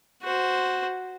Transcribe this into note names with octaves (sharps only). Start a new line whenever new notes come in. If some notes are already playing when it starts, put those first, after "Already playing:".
F#4 C5